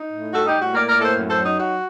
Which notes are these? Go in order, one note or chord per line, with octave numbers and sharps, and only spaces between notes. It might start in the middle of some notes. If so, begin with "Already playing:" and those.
Already playing: D#4
A2
G3 F#4 A4
D#4 G4
A2
F#4
A#3 A#4 D5
A#4 D5
A2
A4 C5
F#2
A4 C5
F#3
D#4
D#4 F#4